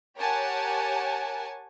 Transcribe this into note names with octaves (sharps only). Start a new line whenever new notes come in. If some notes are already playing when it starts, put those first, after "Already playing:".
G4 A#4 C#5 F#5 G#5 A5